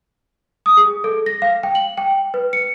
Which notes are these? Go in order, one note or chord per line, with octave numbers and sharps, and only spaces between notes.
D#6
G#4
A4
A#6
F5
G5
F#7
G5
B4
C#7